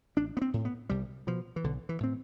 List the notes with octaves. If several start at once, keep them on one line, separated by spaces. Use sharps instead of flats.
A1 D4
B3
C4
A2
B3
C2 G3
B2 F3
E3
B1 D3
E3
A2 C4